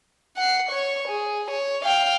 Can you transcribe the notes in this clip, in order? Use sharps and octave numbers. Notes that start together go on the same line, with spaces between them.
F#5 C7
C#5 C#6
G#4
C#5
F5 G5